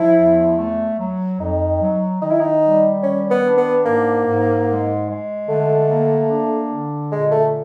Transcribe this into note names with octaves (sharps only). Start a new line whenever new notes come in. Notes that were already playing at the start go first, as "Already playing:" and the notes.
Already playing: F3 E4
E2
A3
F#3
F2 D#4
F#3
D#3 D#4
E4
D#4
G3
D#3 C#4
B3
D4
B3
G#2 A#3
G#2
G#3
G#3
D3 A3
A#3
D4
D3
A#2 G#3
A3